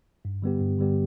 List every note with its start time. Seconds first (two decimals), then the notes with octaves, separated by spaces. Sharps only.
0.25 G2
0.42 D3 G3 B3 G4
0.61 G2
0.78 D3 G3 B3 G4